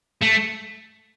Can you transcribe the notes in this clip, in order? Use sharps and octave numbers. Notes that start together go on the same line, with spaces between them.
A3